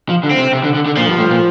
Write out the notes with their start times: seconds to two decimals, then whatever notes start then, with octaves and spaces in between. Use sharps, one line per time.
0.09 F3
0.23 D3
0.31 C4
0.38 C3
0.53 C3
0.64 D3
0.74 D3
0.86 D3
0.97 A#2 F3
1.08 G2
1.19 A2
1.31 A#2